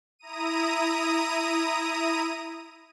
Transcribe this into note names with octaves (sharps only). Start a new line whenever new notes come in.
E4 A#5 D#6 D#7